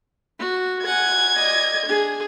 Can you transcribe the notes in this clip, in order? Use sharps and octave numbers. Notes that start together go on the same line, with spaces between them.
F#4
F#5 G#5 G#6
D5 D#5
D4 G#4